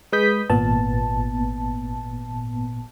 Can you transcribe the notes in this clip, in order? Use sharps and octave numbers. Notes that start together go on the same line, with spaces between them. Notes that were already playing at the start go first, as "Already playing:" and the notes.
G#3 B4 D#6 G6 B6
G#1 A#2 B3 A5